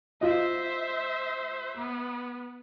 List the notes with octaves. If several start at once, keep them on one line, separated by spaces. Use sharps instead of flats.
F4 C5 D#5 E5
B3